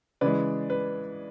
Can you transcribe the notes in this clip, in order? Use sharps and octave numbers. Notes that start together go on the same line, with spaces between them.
C#3 E3 G#3 B4 D5
B4